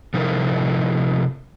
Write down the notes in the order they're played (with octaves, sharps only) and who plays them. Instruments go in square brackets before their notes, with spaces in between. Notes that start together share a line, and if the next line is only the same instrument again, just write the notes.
[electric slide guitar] C3 F3 D#4 E4 A4 A#4